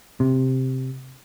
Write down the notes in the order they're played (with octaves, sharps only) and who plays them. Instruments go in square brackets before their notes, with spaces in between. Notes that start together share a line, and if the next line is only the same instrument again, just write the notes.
[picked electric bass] C3